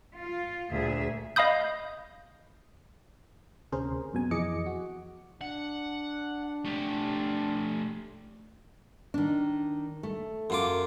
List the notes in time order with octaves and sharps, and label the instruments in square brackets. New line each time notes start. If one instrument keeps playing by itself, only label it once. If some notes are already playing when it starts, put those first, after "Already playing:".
[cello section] F4
D2 A#2 G#4 E5
[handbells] D#5 F5 B5 D#6 G6
[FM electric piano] D2 C3 C#4 G#4 A#4 C5
F#2 B2 G#5
F2 E3 G#4 D#5 D6 C#7
F#4
[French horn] D4 [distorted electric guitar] F#5
[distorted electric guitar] A3 G4
[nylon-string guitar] D#3 D4
A3
[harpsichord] F#2 F4 D6